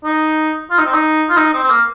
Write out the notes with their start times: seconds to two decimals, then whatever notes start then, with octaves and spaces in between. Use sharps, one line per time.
0.04 D#4
0.70 F4
0.78 D#4
0.85 C4
0.93 D#4
1.29 F4
1.37 D#4
1.53 C4
1.63 C4
1.70 A#3